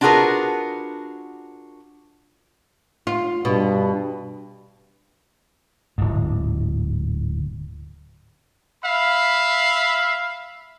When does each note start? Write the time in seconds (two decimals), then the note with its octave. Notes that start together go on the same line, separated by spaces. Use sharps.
0.01 D4 F4 F#4 G#4 A#4 B4
3.07 F4
3.45 G2 B2
5.98 D1 G#2
8.84 E5 F5 B5